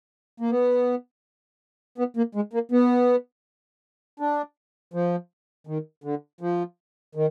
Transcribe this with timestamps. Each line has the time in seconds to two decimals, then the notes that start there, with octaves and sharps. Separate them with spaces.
0.40 A#3
0.51 B3
1.98 B3
2.17 A#3
2.35 G#3
2.53 A#3
2.72 B3
4.20 D4
4.94 F3
5.67 D#3
6.04 D3
6.41 F3
7.15 D#3